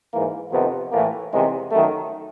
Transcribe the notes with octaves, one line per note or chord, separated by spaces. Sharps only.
G#2 E3 A#3
F2 C3 D#3 B3
A2 E3 A#3
E2 C3 D#3 G#3
F#2 D#3 A3